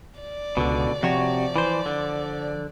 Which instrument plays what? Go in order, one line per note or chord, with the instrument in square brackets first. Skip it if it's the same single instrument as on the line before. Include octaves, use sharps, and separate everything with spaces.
[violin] D5
[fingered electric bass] C#2 [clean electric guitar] B2 D3
[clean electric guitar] C3 F#4 C#5 [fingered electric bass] F3
[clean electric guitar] E3 C5
D3